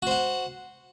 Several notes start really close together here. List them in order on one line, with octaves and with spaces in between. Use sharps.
F#4 C5 F#5